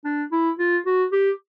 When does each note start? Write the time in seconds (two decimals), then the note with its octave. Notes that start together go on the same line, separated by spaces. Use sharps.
0.05 D4
0.32 E4
0.59 F4
0.86 F#4
1.12 G4